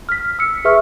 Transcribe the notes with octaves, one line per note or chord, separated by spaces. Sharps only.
F6 B6
E6 C#7
G#4 B4 E5 C#6 F6